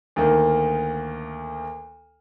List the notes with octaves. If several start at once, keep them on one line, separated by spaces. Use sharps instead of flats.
D2 D#3 A#3